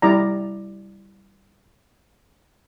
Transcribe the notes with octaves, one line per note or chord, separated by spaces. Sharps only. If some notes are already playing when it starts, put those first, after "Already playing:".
G3 E4 D5 A#5